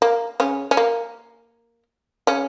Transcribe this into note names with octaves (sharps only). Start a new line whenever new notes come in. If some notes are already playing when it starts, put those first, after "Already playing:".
A#3
C#3 C#4
C#4
A#3
C#3 C#4